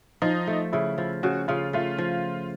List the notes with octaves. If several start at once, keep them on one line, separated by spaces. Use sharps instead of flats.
F3 D#4
A3
C#3 E4
F3
C#3 F#4
C#3 F4
A3 F4
F3